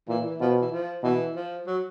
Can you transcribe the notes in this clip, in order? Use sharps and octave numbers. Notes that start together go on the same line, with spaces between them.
A#2 E3
E3
B2 F3
E3
F3
B2 E3
F3
F#3